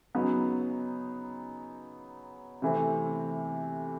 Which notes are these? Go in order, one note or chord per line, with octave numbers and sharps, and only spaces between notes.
C#3 F#3 B3 D#4
C3 E3 A3 C4